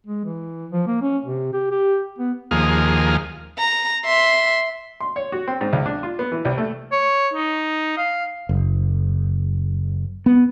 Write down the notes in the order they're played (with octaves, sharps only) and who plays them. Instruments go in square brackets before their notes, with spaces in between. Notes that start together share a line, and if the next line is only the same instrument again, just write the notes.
[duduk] G#3
E3
F3
A#3
C#4
C3
G4
G4
B3
[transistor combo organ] D#2 F3 A#3 G#4 D#6 F6
[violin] A#5
E5 C6
[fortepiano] C6
C#5
F#4
C4
G#2
C#2
D4
F4
B3
E3
C2
A3
[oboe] C#5
D#4
F5
[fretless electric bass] F#1
B3